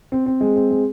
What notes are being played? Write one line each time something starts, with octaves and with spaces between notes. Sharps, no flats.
C4
C4
G#3
C4
G#3